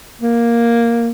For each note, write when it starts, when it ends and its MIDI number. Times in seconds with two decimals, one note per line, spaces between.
0.22 1.12 58